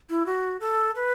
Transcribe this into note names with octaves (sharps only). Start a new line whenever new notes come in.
E4
F#4
A4
B4